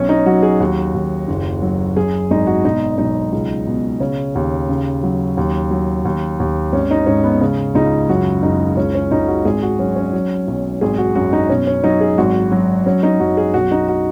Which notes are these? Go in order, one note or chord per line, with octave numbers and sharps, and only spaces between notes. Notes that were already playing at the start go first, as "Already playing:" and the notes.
Already playing: B1 C#4
D#4
F#3 F#4
G#4
D#2 F#4
D#2
F#1
F#3
F#2 G#4
G#1 D#4
F#4
B2 D#4
B1 D#4
C#2
B2
C#3 C#4
D#2
C#3
F#3
D#2
F#3
D#2
D#2
G#1 C#4
D#4
G#2 C#4
B3
C#3 C#4
C#2 D#4
F#2 F#4
F#1 D#4
C#2 C#4
C#4
C#2 D#4
F#4
G#1 G#4
F#4
F#3 C#4
C#4
F#3
B1
G#1 G#4
F#4
F#2 F#4
D#4
B2 C#4
C#4
F#3 D#4
G#4
G#1 F#4
F#3
F#3 C#4
D#4
F#2 F#4
G#4
B1 F#4
D#4
F#4